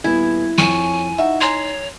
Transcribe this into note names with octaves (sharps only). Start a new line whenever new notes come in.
D#1 B3 E4 G#5
F2 C#5 G#5 C#6
D#4 F#4 E5
C#5 G#5 A#5 C6